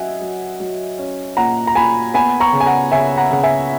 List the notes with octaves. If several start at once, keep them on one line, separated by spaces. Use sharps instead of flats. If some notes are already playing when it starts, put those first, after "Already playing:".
Already playing: F#3 C#4 D#5 E5 F#5 G#5
F#3
F#3
C#4
A#2 F#5 A#5
A#5
A#2 G#5 B5
B3 G#5 B5
A#5 C#6
C#3
G#5
F#5 A#5
C#3 E5 G#5
F#5 A#5
C#3 F#5
E5 G#5